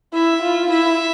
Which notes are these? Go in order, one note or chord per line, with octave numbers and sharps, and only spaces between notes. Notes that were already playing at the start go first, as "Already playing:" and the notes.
E4 E5
F4
E4 E5